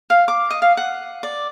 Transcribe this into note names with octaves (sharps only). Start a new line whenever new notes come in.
F5
D6
D#5
F5
F#5
D5